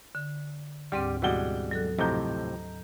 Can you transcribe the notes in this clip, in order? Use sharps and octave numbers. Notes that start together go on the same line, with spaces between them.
D3
D2 G#2 G3 C4 G4
B2 E3 G3 G#3 F#5 G7
F#3 A4 F#6
F2 A2 C3 D#5 A#5 G6